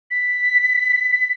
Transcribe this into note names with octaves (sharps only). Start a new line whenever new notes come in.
B6